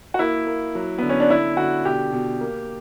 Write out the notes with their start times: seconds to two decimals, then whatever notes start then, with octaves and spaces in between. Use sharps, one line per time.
0.14 F#4
0.19 A#3 E4
0.47 A#3
0.75 F#3
0.98 D3 B3
1.09 C#4
1.20 D4
1.30 D3 E4
1.57 D3 F#4
1.85 B2 G4
2.12 B2
2.40 A#3